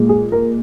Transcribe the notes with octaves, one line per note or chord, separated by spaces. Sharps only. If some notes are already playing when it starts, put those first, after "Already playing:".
Already playing: A#2 G#3
G#4
A#4